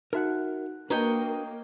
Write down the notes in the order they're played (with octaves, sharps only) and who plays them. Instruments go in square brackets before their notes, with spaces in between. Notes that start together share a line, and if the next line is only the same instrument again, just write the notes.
[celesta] D#4 F#4 F#6 [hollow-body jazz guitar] A#4 E5 F#5
[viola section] A#3 [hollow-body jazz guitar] D4 F#4 B4 [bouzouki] C#5 D#5 G5 [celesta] A#5